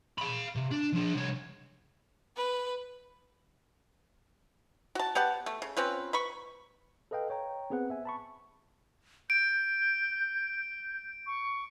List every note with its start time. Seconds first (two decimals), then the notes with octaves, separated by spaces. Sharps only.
0.18 F5 B5
0.56 C3
0.71 D4
0.93 F3 D4
1.14 C2 C#5
2.37 B4
4.95 F#4 A5
5.15 B3 G4 F#5 A5
5.46 A3
5.62 C#3
5.77 C4 C#4 F4 B4
6.13 B4 B5 C#6
7.11 A4 B4 D#5 F5 G5
7.30 C#5 G5 A#5
7.70 B3 C4 G#4 B4 F#5
7.90 E5 G#5
8.05 A5 B5 C#6
9.30 G6 D7
11.27 C#6